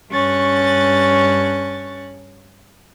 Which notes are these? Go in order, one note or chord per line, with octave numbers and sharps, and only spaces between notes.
G2 C#4 C#6 F#6 A6